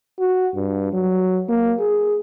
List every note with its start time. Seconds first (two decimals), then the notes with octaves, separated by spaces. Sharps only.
0.19 F#4
0.55 G2
0.92 F#3
1.49 A#3
1.80 G#4